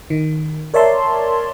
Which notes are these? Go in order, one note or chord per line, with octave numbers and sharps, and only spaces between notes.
D#3
A#4 C#5 D5 E5 A5 C6